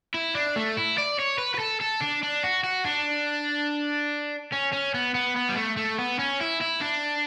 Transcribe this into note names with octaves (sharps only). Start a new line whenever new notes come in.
E4
D4
A3
E4
D5
C#5
B4
B4
A4
A4
D4
D4
F#4
F#4
D4
C#4
C#4
B3
B3
B3
G3
A3
A3
B3
C#4
E4
E4
D4